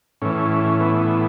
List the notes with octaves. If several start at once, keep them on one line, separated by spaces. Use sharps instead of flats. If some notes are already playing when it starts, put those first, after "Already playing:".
A2 E3 C#4
B3